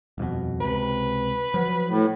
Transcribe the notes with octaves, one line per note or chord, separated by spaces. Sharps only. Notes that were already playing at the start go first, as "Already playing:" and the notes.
D#1 F2 B2
C#2 C3 B4
F3 F#3
A2